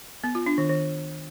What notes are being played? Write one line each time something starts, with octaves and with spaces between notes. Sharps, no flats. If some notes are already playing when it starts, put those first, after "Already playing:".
B3
F4
D4
D#3
D#3